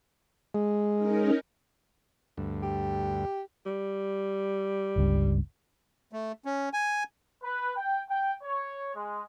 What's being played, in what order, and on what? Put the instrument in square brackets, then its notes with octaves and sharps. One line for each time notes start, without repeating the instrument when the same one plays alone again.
[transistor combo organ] G#3
[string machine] C#4 D#4 A#4
[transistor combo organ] D2 G2
[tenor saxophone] G4
[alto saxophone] G3
[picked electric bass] G1 C#2 G2
[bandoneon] A3
C#4
G#5
[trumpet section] B4
G5
G5
C#5
G#3